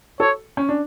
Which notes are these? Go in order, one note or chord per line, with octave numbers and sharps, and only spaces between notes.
A4 C#5
C#4
D4